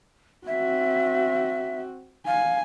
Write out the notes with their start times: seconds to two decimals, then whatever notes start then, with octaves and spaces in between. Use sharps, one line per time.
0.47 C4 F#4 E5
2.27 F5 G#5